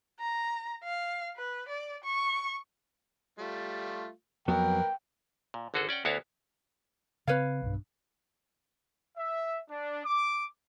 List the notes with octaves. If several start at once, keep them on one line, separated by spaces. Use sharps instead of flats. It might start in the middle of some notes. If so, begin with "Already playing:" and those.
A#5
F5
B4
D5
C#6
G3 A3 F4
F2 F#3 A#3 B3 A#4 B4 G5
A#2
G#1 D3 F#4 G#4 A4
C#4 D5 F#5 G5
D2 B3 E4 F#4 C#5 F5
C#3 C4 B4 C#5 F5
B1 G2
E5
D4
D6